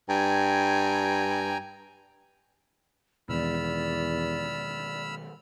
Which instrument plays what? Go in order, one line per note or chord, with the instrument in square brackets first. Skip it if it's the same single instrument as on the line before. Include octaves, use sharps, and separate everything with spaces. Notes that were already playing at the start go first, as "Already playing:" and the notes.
[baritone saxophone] G2 [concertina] G5 G#5 A#5
[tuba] E2 [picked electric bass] B2 D#3 G#3 [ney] D5 [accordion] B5 E6 F6